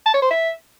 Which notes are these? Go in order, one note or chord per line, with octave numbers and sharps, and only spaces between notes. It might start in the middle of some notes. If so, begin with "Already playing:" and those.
A5
C#5
C5
E5